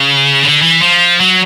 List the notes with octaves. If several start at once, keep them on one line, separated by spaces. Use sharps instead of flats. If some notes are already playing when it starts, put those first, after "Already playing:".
Already playing: C#3
D3
E3
F3
F#3